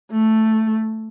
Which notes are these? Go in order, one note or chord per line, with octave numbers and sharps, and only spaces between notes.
A3